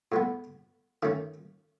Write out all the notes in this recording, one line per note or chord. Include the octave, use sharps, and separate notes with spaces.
A2 G#3 B3
D#3 A3 C#4